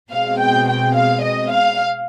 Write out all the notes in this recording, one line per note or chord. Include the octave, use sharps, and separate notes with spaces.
B2 G#3 C4 F5
G5
G5
F5
D#5
F5